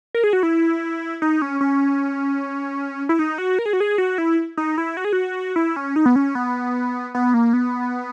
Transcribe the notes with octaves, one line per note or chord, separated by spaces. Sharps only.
A#4
G#4
F#4
E4
D#4
C#4
C#4
E4
D#4
F#4
A#4
G#4
F#4
G#4
F#4
E4
D#4
E4
F#4
G#4
F#4
E4
C#4
D#4
B3
C#4
B3
B3
A#3
B3